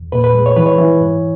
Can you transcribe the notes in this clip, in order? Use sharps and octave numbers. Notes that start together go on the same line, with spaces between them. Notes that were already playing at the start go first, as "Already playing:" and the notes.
Already playing: E2
A#2 B4
B4
G#3
C#5
E3 B4
C#5
E3
G#2